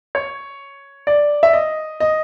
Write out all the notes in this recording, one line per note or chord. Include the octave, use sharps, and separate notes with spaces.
C#5
D5
E5
D#5
D#5